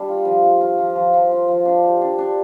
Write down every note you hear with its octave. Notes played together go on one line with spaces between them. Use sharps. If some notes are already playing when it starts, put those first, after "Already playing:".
Already playing: G3 D4
F4
F3
F4
F4
F3
F3
F3
F4
F3
D4
G4
D4
D4